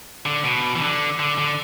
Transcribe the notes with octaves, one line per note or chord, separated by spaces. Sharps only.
D3
B2
E3
D3
D3
D3